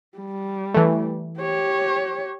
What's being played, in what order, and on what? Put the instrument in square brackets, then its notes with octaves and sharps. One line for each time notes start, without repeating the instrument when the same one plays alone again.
[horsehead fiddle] G3
[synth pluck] E3 A3
[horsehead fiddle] G4 C#5